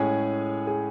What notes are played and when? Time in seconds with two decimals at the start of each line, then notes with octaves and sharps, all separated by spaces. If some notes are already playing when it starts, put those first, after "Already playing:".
Already playing: A2 G#3 C#4 G#4
0.67 G#4